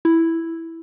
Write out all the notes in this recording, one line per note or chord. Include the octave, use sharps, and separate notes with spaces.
E4